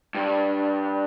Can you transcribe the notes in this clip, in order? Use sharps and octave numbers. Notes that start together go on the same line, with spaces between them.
G2